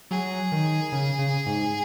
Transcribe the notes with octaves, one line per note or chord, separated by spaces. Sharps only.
F#3 G#4
D#3
C#3
C#3
G#2